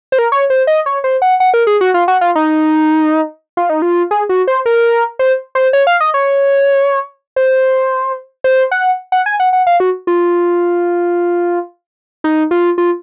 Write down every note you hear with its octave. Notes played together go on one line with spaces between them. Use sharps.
C5
A#4
C#5
C5
D#5
C#5
C5
F#5
F#5
A#4
G#4
F#4
F4
F#4
F4
D#4
F4
D#4
F4
G#4
F#4
C5
A#4
C5
C5
C#5
F5
D#5
C#5
C5
C5
F#5
F#5
G#5
F#5
F#5
F5
F#4
F4
D#4
F4
F4